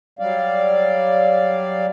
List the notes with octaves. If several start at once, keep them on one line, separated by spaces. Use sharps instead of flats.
F#3 G3 D5 F5